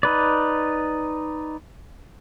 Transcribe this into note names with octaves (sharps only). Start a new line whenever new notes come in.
D#4 B4 D5